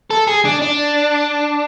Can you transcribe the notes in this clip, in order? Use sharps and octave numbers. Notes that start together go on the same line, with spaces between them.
A4
G#4
D4
D4